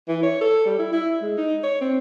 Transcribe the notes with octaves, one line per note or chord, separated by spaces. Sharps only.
E3
C#5
A4
G3
E4
E4
G#3
D#4
C#5
C4